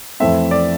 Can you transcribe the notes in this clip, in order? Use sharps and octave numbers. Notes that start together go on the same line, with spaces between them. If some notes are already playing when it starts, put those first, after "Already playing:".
F2 E3 A3 C4 E5
D5